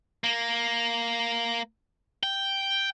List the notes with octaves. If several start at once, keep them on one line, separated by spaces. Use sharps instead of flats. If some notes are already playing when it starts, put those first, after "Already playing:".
A#3
G5